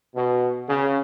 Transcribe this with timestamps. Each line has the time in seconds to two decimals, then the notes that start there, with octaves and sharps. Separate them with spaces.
0.15 B2
0.69 C#3